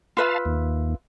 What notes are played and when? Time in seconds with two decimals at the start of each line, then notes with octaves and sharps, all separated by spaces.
0.17 F4 B4 E5 F5 A5
0.45 D#2